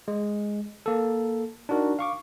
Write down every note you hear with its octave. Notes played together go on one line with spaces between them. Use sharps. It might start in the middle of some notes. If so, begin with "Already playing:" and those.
G#3
A#3 A4
D4 D#4 F#4 A#4
F5 C#6 D6